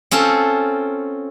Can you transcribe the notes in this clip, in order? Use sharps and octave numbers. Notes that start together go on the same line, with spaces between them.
C4 C#4 F4 A4